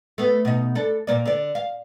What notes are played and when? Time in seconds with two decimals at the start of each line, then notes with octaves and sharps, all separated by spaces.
0.18 A3 B3
0.45 B2 D#4
0.75 D4 A4
1.07 A#2 A#3 D5
1.25 D3 D5
1.55 F5